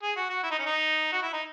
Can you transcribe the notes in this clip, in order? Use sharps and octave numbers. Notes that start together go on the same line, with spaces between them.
G#4
F#4
F#4
E4
D#4
C#4
D#4
F#4
E4
D#4